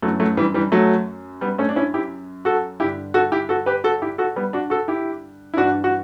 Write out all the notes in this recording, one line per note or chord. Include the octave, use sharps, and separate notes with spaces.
F#2 E3 F#3 A3
F#3 A3
E3 G3
E3 G3
F#3 A3
G3 B3
A3 C#4
D4
C#4 E4
E4 G4
F#4 A4
G2 D3 E4 G4
F#4 A4
E4 G4
F#4 A4
G4 B4
F#4 A4
E4 G4
F#4 A4
G3 B3
D4 F#4
F#4 A4
E4 G4
E4
G2 E3 D4 F#4
F#4